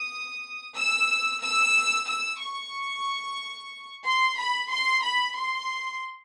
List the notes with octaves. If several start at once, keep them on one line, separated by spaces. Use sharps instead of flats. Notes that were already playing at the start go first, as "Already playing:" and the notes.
Already playing: D#6
E6
E6
E6
C#6
C6
B5
C6
B5
C6